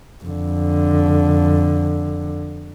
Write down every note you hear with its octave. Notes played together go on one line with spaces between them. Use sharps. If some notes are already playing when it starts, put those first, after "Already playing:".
F2 D3